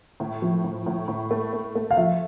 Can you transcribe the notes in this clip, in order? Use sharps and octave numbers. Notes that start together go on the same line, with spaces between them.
A2
F3
A2
A2
A2
A3
A3
A3
F5
F3 E5